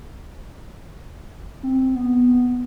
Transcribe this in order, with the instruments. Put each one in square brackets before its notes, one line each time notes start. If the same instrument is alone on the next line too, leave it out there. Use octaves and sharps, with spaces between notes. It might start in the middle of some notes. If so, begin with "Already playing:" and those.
[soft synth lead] C4
B3